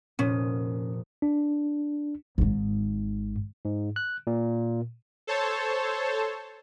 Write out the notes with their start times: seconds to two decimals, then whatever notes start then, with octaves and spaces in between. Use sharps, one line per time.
0.19 F1 A#2 C#4 D#6
1.22 D4
2.38 G#1 G#2
3.65 G#2
3.96 F#6
4.27 A#2
5.27 A4 C5 C#5 A5